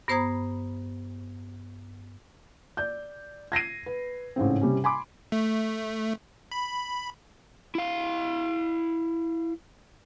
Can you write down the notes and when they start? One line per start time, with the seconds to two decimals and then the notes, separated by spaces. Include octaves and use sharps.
0.08 G2 B3 C5 A#5 D#6 G#6
2.77 D5 G6
3.52 G#6 A#6 C7 D#7
3.86 B4
4.36 A1 G#2 C#3 C4
4.61 C3 G3 C#4
4.84 G#5 B5 C6 D6
5.32 A3
6.51 B5
7.75 E4 F5